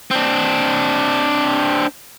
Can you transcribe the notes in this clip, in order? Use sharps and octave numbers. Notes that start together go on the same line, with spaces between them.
C4 D4